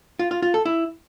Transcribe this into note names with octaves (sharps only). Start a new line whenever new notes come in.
F4
F4
F4
A4
E4